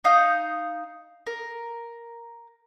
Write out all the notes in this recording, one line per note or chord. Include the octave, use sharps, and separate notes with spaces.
D#4 F5 D#6 G6
A#4